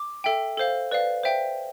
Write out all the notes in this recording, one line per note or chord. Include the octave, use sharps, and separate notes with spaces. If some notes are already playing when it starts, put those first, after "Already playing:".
Already playing: D6
A4 E5 G5
A4 C5 F5
B4 D5 F5
C5 E5 G5